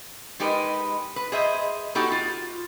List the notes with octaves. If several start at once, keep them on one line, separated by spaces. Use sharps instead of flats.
G#3 D#4 G4 A#4 B4
B4
G#4 C5 D#5 E5
A#3 D#4 E4 F#4 G4 A4
F4